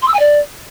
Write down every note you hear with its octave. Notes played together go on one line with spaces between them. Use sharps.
C6
E6
G#5
D5